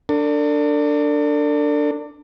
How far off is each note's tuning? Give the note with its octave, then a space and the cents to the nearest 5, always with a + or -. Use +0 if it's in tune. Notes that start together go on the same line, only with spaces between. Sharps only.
D4 +0 A4 +40